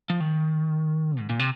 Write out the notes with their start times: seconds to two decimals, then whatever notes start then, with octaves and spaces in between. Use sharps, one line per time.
0.10 F3
0.20 D#3
1.19 G#2
1.30 A#2
1.39 C3